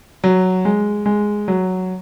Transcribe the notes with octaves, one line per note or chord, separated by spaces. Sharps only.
F#3
G#3
G#3
F#3